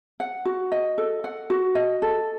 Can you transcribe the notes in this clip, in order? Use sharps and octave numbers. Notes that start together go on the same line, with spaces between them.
F#5
F#4
D#5
A4
F#5
F#4
D#5
A4